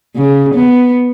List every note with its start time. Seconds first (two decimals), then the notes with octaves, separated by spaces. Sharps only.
0.16 C#3
0.55 B3